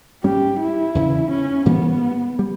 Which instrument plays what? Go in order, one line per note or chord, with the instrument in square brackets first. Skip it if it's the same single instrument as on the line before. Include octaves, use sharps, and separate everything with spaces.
[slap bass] G#2 G3 C#4 [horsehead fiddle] G4
[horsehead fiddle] E4
[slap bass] E2 C#3 E3
[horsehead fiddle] C#4
[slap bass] G#2 E3 G3 A#3 [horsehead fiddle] B3
[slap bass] G3